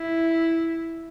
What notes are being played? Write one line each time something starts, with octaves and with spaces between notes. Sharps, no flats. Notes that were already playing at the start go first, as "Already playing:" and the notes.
Already playing: E4